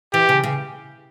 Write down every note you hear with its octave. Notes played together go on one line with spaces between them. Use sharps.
E3 G4
C#3
C#3